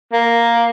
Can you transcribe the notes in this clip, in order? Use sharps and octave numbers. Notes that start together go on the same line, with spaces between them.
A#3